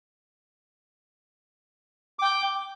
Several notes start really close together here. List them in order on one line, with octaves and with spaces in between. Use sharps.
D6 G5 G6